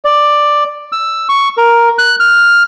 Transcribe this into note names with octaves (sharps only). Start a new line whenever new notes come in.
D5
E6
C#6
A#4
F#6
F6